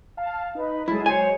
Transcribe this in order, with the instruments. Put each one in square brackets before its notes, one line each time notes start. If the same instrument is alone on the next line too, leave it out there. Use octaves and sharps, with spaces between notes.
[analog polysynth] F5 A5
[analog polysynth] D#4 [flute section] B4
[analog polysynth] F#3 G#3 [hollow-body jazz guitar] E4 [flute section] G#4 A4
[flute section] C5 C#5 [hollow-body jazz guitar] G#5